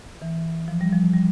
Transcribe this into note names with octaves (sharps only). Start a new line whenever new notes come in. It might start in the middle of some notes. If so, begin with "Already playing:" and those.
E3
F3
G3
F3
G3